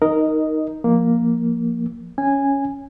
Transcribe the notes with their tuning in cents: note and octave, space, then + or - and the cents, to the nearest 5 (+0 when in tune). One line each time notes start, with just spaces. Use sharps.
D#4 +0 A#4 +0 D#5 +0
F3 +0 A#3 +0
C#4 +0 G#5 -10